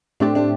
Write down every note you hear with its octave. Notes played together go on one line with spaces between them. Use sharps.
A2 A3 C4 D4 G4 D5
D4